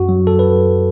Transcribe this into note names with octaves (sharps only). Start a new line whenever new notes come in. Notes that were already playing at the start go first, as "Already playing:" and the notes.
Already playing: F#2 F#4
F#3
F#3 A4
B4